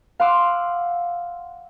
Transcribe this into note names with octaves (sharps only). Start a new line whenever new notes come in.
F5 F#5 C6 D6 E6